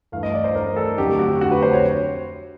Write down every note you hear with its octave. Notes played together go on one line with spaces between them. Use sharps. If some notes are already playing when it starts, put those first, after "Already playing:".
G2 E3 A3 F5
D#5
D5
C5
G2 E3 A3 A#4
A4
F2 D3 F#3 A3 G4
F#4
F2 D3 F#3 A3 F#4
B4
C5
C#5